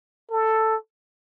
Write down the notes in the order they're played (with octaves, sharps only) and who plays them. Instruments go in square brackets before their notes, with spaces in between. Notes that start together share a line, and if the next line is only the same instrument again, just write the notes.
[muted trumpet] A4